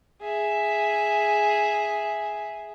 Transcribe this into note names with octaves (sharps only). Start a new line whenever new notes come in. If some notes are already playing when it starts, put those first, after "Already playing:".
G#4 E5